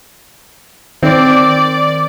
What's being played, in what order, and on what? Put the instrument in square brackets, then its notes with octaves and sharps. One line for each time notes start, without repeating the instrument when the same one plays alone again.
[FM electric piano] D#3 [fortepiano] C4 [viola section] D5